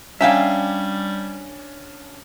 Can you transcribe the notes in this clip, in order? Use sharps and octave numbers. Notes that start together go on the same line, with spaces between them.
G3 C#4 D4 E5 F5 G5 G#5 A#5